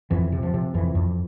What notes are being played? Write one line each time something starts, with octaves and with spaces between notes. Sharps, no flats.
F2 E3
C3
F3
C3
F2 E3
F2